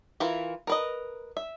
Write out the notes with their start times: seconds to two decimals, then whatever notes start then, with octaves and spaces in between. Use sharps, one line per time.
0.20 E3 E4 F4 A#4
0.67 A#4 B4 D#5
1.37 E5